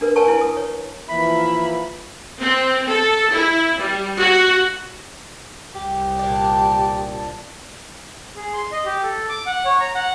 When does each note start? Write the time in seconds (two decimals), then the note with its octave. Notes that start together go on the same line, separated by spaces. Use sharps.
0.01 D4 A#4 B4
0.16 A#4 C#5 G#5 A5 C#6
0.28 E4 B4 G#5
0.41 D#6
0.57 C#5
1.08 E3 F3 A#3 E5 B5
2.40 C4
2.87 A4
3.31 E4
3.77 G3
4.18 F#4
5.75 C2 G4
6.19 A#2 D4
8.36 G#4
8.54 C6
8.72 D#5
8.85 G4
9.03 A4
9.29 D6
9.46 F#5
9.65 C#5
9.80 A#5
9.95 F#5